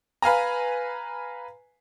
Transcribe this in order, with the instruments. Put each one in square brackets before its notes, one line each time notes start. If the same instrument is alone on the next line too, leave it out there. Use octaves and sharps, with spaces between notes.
[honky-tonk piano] B4 F5 G#5 A#5